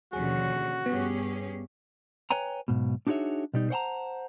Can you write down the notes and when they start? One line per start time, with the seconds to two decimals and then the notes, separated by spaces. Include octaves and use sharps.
0.13 D#2 B2 D3 F3 C#4 F#4 G#4
0.86 G2 B3 C#4 G4 G#4
2.31 B4 C#5 G5 G#5 A#5
2.68 B1 G#2 B2
3.07 D4 D#4 F#4 G#4 C#5 E5
3.54 B2 G3 D#4
3.70 C5 C#5 F#5 G5 A5 A#5